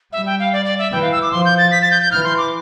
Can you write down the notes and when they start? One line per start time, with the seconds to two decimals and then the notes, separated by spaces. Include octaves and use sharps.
0.13 G3 E5
0.26 G5
0.40 F5
0.53 D5
0.65 D5
0.79 E5
0.92 E3 G5
1.02 F5
1.12 E6
1.22 D6
1.32 F3 C6
1.45 G6
1.58 A6
1.71 B6
1.82 A6
1.91 G6
2.02 G6
2.11 E3 F6
2.24 C6
2.38 D6